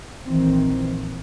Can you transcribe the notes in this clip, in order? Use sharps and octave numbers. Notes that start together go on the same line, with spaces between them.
A#1 D#3 E3 C4